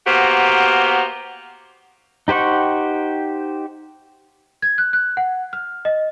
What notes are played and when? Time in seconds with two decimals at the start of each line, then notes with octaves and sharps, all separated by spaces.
0.07 A#3 B3 F#4 G4 A#4 C5
2.28 D#4 G4 C5 F#5 C#6
4.62 G#6
4.78 F#6
4.93 F#6
5.17 F#5
5.53 F6
5.85 D#5